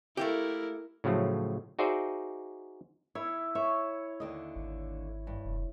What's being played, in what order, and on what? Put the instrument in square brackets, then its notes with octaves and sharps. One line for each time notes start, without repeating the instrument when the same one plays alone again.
[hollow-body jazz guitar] A3 A#3 G4 [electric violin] E4 A#4
[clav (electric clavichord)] A2 C#3 F3 F#3 A3
D#4 F#4 G#4 C5 D5 E5
[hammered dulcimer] E4 [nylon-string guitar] C#5
[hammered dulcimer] C#5 [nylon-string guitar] E5
[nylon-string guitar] D#2 D3 D#5
[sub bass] G#1
[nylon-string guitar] G2
[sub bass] F1